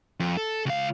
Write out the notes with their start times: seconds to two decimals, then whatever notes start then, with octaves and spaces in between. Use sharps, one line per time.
0.20 F2
0.37 A4
0.66 C#2 F5